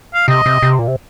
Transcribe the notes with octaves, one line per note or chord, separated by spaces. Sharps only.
F5
C3 D#5
C3
C3
A#2
C3